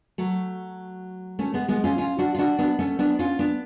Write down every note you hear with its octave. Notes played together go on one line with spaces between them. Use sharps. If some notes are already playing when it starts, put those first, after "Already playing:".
F#3 A3
A3 C#4
G#3 B3
G#3 B3
C#4 F4
C#4 F4
D4 F#4
F4
D4 F#4
B3 D4
A3 C#4
B3 D4
C#4 F4
B3 D4